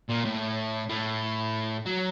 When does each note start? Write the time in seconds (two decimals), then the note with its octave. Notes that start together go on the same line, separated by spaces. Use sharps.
0.09 A#2
0.24 A2
0.89 A2
1.86 F#3